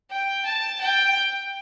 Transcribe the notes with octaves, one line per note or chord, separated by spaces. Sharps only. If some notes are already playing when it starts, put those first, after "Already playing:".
G5
A5
G5